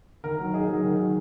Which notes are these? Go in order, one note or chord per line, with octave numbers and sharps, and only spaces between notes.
D#3 A#4
F#3
D#4 G#4
F#3
D#3
F#3